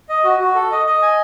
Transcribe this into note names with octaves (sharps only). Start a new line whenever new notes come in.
D#5
F#4
F#4
A4
D#5
D#5
G#5